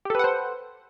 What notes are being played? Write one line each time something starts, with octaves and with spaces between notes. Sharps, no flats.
G4 A4 B4 C5 F#5